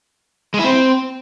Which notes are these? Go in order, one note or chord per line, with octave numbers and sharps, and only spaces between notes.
G#3
E4
C4